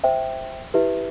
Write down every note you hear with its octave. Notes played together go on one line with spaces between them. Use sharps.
C5 E5 G5
E4 G4 B4 E5